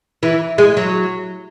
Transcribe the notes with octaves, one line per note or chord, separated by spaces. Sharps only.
E3
G#3
F#3